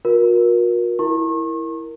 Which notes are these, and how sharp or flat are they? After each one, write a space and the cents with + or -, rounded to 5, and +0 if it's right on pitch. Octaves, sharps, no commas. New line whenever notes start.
F#4 -45 A#4 +30
E4 +0 A#4 +0 C#6 -40